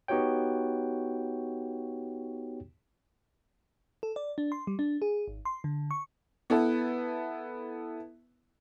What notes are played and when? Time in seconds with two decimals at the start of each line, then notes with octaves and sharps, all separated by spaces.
0.08 B3 D#4 F#4 G4 C#5 G5
4.03 A4
4.16 D5
4.38 D4
4.52 C6
4.67 G3
4.79 D4
5.02 G#4
5.28 G#1
5.45 C6
5.64 D3
5.91 C#6
6.50 B3 E4 A4 B4